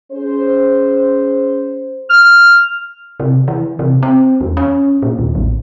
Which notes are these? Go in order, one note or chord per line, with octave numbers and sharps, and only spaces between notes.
C#4 G#4 C5
F6
C3
E3
C3
C4
E2
C#4
A#2
D#2
A1